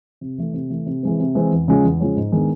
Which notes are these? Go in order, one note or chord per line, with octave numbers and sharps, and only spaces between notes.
C3
E3 A3
C3
E3 A3
C3
E3 G#3 C4
C3
E3 G#3 C4
E2
C#3 F3 G#3 C#4
E2
C#3 F3 G#3 C#4
G#2
D#3 G#3 B3 D4